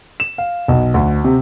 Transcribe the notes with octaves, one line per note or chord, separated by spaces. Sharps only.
E7
F5
B1
D2
C3